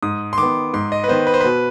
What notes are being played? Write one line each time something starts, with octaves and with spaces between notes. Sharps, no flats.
G#2 D#6
C6
D#3 B3 D6
G#2 C6
D#5
B4
D#3 B3 C5
B4
C5
B2 B4